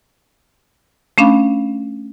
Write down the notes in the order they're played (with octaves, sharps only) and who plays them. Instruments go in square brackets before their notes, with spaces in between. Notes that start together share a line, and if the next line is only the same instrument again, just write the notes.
[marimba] A3 C#4 D4 F5 B5